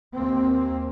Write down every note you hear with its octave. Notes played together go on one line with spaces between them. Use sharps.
D#2 A#3 C4